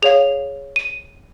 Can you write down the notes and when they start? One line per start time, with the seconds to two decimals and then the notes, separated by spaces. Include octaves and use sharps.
0.02 G#4 C#5 F5 F7
0.76 D#7